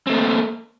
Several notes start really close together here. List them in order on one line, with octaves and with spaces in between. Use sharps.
C4 A3 A#3